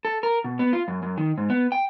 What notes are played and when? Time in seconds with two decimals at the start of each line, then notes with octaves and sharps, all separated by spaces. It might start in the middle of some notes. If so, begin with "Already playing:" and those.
0.05 A4
0.23 A#4
0.44 B2
0.59 B3
0.73 F4
0.88 F#2
1.03 F#2
1.18 D#3
1.38 G#2
1.50 B3
1.72 G5